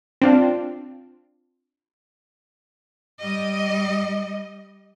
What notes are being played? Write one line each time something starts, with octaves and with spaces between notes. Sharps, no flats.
C4 D4 F4
G3 D#5